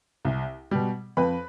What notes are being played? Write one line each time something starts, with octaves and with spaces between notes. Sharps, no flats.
C2
B2 G3
F2 B4 B5